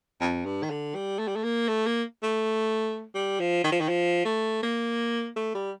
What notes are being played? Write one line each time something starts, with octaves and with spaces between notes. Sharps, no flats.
F2
G2
D#3
D3
G3
A3
G3
A3
A#3
A3
A#3
A3
G3
F3
D#3
F3
D#3
F3
A3
A#3
A3
G3